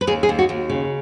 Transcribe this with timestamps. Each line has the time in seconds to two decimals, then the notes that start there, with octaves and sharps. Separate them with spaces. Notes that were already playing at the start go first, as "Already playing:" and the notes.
0.01 B4
0.07 D#2 G#4
0.23 G#4
0.29 D#2
0.39 F#4
0.49 D#2
0.70 C#3